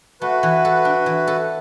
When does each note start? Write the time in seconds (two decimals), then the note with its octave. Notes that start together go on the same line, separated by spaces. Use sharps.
0.21 A3 F#4 B4
0.43 E3
0.65 A4
0.85 D4
1.06 E3
1.27 A4